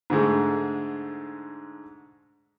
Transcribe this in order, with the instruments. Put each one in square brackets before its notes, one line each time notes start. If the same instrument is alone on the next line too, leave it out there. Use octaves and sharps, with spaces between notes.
[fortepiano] G#2 D3 G#3 A3